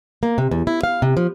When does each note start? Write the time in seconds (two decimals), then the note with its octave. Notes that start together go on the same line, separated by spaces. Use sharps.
0.23 A#3
0.38 C3
0.51 E2
0.67 E4
0.83 F5
1.02 C3
1.17 F3